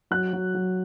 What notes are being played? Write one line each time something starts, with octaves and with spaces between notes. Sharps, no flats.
F#3 F#6
F#3
F#3